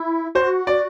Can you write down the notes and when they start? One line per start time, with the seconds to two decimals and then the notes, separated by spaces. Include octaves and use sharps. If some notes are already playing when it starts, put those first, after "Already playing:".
Already playing: E4
0.35 F#4 C5
0.67 D5